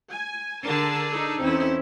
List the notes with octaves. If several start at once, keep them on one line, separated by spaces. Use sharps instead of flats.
G#5
D3 D4 G#4 A#4 A5
D#4 A4
E2 C4 C#4 E4